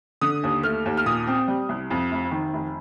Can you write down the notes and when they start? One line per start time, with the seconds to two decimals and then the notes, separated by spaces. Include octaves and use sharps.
0.21 D3 D#6
0.43 D#2
0.63 A3 F6
0.85 D#2
0.97 F6
1.06 A#2 D#6
1.27 C4
1.48 G3
1.69 C2
1.91 F2
2.12 F1
2.31 D#3
2.53 F1